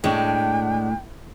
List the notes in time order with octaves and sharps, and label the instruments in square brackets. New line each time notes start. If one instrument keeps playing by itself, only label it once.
[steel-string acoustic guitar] A2 [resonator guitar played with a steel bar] G#3 D4 [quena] G5